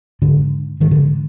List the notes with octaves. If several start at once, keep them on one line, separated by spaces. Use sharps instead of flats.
G#2 D3
G#2 D#3
D3